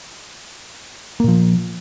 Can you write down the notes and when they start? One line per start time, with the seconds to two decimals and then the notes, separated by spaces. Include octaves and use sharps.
1.20 A#3
1.24 A#2
1.28 F3